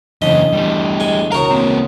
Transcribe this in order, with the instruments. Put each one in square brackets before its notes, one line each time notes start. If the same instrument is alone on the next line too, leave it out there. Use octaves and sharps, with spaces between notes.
[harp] E1 D4 B6 [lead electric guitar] F#2 C#3 [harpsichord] D#5
[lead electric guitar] G3 A3
[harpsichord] G#3 G#5
[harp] C#2 [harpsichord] F#4 A#4 [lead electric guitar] A#5
[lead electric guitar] A#3 C4